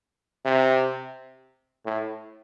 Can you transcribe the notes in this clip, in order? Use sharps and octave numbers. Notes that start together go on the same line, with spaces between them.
C3
A2